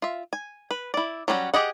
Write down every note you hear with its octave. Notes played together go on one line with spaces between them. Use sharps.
F4 E5
G#5
B4
E4 D5
F#3 G3 C#4 D#4 F#4
G4 G#4 D#5 F#5